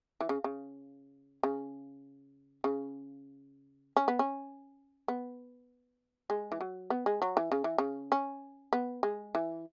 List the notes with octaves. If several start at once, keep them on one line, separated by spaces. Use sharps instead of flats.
E3
C#3
C#3
C#3
C#3
C#4
B3
C#4
B3
G#3
E3
F#3
B3
G#3
F#3
E3
C#3
E3
C#3
C#4
B3
G#3
E3